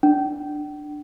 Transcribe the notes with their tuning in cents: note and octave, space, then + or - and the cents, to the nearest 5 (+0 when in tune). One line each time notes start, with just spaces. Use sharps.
D4 +10 G5 -40